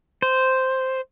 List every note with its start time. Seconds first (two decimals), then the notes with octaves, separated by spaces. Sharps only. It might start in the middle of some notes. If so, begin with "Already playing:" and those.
0.22 C5